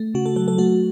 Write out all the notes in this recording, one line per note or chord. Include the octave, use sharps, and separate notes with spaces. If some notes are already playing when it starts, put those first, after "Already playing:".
Already playing: A3
C#3 F#4
A4
F#3 A4
A4
A3 F#4